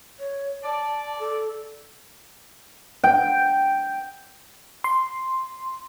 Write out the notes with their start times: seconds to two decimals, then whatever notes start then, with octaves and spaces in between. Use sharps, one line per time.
0.20 C#5
0.64 D5 A5
1.19 A4
3.04 G5
4.84 C6